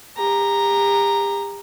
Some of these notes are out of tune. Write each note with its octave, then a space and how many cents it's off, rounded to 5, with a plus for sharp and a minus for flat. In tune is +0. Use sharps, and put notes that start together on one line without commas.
G4 +40 A#5 +0